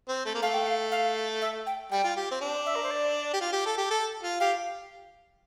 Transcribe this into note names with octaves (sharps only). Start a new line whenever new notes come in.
C4
A3
A#3
A3 F5
G5
F5
F5
E5
G5
G3 G5
F4
G4
C4
D4
E5
A#4
C5
D5
G4
F4
G4
A4
G4
A4
F4
G4 F5